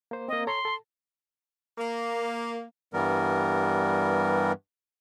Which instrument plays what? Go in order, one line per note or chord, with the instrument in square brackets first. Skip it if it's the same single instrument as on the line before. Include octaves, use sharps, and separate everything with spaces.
[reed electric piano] A#3 C5
[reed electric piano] A#3 C4 [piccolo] D#5
[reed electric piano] A4 C#5 A#5 [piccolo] C6
[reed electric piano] A4 A5
[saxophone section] A#3
[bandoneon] G2 E3 G3 B3 A#4